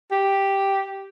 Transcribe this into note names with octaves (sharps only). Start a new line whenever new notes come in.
G4